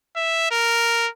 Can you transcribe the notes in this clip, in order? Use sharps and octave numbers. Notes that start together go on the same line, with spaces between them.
E5
A#4